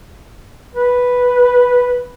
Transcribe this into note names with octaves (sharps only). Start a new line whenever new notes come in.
B4